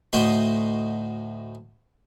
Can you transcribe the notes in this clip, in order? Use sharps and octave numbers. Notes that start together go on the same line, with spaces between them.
D2 A2 D#4 F#4 D#5 C6